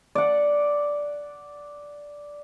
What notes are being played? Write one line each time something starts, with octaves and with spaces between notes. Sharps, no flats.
D5 F#5